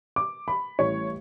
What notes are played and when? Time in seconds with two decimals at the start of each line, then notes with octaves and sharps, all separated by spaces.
0.16 D6
0.48 B5
0.79 A1 A2 G3 C#5